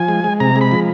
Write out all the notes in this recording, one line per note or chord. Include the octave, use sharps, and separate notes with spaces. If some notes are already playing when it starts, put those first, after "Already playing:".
Already playing: F3 G#5
G#3
G#3
C3 A#5
G#3
B5
F3